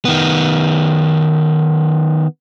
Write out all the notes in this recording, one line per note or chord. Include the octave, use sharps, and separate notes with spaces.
D#3 B3